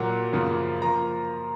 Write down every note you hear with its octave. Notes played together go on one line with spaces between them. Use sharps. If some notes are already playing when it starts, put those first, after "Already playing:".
Already playing: A#2 F#3 A#3 F#5
F#2 C#3 F3 A#3
F3 A#3 A#5